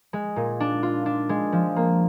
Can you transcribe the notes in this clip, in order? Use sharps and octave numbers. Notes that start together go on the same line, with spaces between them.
G#3
A#2
D4
F4
D4
G#3
F3
A#3